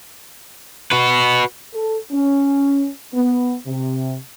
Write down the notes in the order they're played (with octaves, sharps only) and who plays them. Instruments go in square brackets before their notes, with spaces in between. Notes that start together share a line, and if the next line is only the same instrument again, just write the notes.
[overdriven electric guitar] F#4 B4
[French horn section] A4
C#4
B3
C3